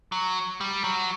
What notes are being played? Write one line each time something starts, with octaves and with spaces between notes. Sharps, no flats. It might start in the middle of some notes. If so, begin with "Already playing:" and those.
F#3
G3
F#3